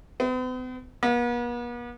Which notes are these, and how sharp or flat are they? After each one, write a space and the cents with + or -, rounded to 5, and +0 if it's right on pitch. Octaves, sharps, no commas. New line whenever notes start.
B3 +45
B3 -45